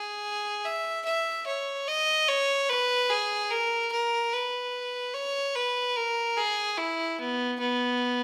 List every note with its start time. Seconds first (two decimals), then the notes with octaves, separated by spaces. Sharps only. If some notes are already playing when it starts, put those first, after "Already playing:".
Already playing: G#4
0.65 E5
1.05 E5
1.47 C#5
1.87 D#5
2.28 C#5
2.69 B4
3.10 G#4
3.51 A#4
3.92 A#4
4.33 B4
5.14 C#5
5.55 B4
5.96 A#4
6.37 G#4
6.78 E4
7.19 B3
7.60 B3